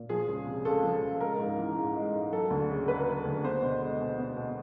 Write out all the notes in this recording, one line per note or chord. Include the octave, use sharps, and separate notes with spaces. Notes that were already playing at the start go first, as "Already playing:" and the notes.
Already playing: A#2
F3 G#4
C#2
C3
C#2 A4
F3
C#2
G#3 A#4
G#2
E3
G#2
G#3
G#2
F#3 A4
D2
C#3
A#3 B4
F#3
D2
B3 C5
B2
G#3
B2
B3
B2